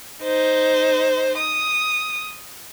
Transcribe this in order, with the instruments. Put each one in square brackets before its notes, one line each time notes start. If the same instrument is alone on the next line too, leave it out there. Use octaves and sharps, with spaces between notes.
[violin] D#4 C5
D#6